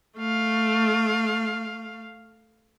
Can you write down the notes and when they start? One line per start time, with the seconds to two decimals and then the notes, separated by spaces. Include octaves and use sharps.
0.17 A3 F5